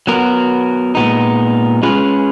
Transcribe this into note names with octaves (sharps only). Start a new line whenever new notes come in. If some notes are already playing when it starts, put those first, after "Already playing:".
F#3 B3 F#4 A#4
A#2 G#3 B3 D#4
G#3 C#4 F4 G#4 B4